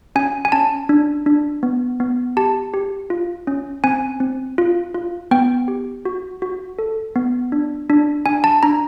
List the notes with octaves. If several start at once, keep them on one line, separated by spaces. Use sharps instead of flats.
C#4 G#5
G#5
C#4 A5
D4
D4
B3
B3
G4 A5
G4
F4
C#4
C4 G#5
C4
F4
F4
B3 G5
G4
F#4
F#4
A4
B3
D4
D4
D4 G#5
A5
D4 A#5